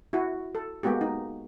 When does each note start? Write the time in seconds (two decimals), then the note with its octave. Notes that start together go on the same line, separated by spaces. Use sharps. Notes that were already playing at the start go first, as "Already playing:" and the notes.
0.13 E4 F#4
0.55 A4
0.83 G#3 A#3 B3 F#4 G4
1.01 D#4